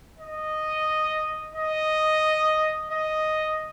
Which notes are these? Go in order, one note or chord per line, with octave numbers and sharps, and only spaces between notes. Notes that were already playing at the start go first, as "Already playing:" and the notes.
D#5
D#5
D#5